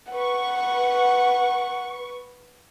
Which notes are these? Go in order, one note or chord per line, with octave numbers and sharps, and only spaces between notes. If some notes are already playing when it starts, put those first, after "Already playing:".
B4 F#5 C#6